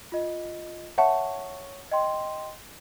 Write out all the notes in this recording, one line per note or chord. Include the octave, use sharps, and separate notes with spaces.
F4 D#5
C#5 E5 F#5 A5 C#6
D#5 G5 C6